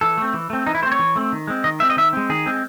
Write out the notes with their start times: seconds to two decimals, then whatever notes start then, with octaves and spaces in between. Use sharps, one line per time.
0.01 E3 A4
0.18 A3 C4
0.34 E3
0.50 A3 C4
0.67 E3 D#4
0.75 E4
0.82 A3 C5
0.86 C4
0.92 C#5
0.99 E3
1.16 A3 C4
1.32 D#3
1.48 G#3 C4
1.64 D#3 D#5
1.80 G#3 C4 E5
1.90 D#5
1.97 D#3 E5
2.13 G#3 C4
2.30 D#3 G#4
2.46 G#3 C4